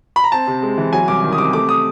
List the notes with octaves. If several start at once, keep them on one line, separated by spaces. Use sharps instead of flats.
B5
A#5
C4 A5
C3
G#3
E3
F#3 G#5
C2 D6
D#3
D#6
C3 D6
A3 D6
D#6